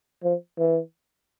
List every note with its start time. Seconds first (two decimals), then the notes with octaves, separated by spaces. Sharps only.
0.24 F3
0.59 E3